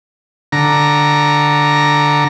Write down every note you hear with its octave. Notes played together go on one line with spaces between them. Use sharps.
D3 A#5